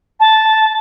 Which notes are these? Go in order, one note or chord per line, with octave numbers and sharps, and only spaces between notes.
A5